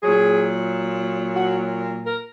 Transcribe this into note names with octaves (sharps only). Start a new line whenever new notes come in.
A#2 F#3 G#4
F#4
A#4